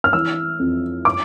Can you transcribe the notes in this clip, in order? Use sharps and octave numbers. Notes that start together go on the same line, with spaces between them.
F6
E3 E6
F2
D6